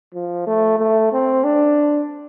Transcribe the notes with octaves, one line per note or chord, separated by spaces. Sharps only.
F3
A3
A3
C4
D4